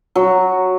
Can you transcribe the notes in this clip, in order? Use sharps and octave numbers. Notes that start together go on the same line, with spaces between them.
F#3